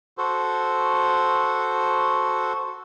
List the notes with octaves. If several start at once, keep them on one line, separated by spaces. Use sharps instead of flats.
F#4 A4 C5